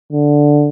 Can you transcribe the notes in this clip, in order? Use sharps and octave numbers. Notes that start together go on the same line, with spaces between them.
D3